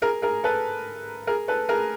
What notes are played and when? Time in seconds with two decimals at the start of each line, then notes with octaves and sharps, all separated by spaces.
0.02 G#4 A#4
0.22 G#4 A#4
0.44 A4 B4
1.27 G#4 A#4
1.48 A4 B4
1.69 G#4 A#4